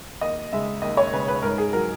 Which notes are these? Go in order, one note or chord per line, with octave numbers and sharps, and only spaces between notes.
D#2 D#5
C#3 G#3 E5
D#2 D#5
C#5
C#3 G#3 B4
B4
G#2 A#4
G#4
F#3 A#4